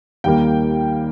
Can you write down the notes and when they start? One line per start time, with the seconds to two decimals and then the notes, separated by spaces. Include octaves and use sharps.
0.24 D#2 D#3 G3 A#3 G5